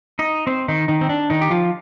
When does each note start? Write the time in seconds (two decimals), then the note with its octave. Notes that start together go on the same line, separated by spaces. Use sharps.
0.19 D#4 D#5
0.47 C4 C5
0.68 D#3 D#4
0.88 D#3 D#4
1.01 C4
1.09 D4
1.30 D#3 D#4
1.41 G4
1.50 F3 F4